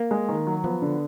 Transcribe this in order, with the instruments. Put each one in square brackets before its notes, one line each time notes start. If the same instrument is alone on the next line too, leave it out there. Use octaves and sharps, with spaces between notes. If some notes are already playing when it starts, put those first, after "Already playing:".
Already playing: [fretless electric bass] A#3
[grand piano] G#3
D#3
F#3
[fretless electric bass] F3 [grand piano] B3
[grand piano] D3